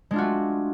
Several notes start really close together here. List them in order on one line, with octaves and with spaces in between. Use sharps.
G#3 D4 F4 F#4 A3